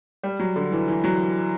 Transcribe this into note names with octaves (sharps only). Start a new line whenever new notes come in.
G3
F#3
D3
E3
E3
F#3